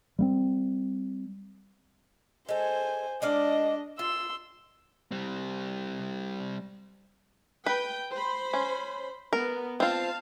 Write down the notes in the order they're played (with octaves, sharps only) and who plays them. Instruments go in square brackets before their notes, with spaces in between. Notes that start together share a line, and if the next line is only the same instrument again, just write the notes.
[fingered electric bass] G3 A3 C4
[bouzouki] G#3 A4 [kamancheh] C5 G#5
[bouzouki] G#3 D5 F5 [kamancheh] D4 D#5
[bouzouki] F4 [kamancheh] C6 E6
[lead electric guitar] G3 C4
[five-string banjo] B4 [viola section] G5
[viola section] C5 B5
[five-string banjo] C#4
[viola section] B3 [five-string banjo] A#4
[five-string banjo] C4 F4 [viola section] F5 A5